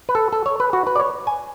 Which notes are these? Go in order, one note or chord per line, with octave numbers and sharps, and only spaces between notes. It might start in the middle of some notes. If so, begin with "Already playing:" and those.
B4
A4
A4
C#5
B4
F#4
B4
D5
C#5
G#5